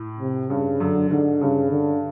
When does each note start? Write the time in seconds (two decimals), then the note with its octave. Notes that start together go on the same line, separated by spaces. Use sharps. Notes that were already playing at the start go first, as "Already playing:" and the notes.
Already playing: A2
0.19 C3
0.49 G2 C#3
0.80 F#2 D3
1.10 G#2 D3
1.41 G2 C#3
1.71 D3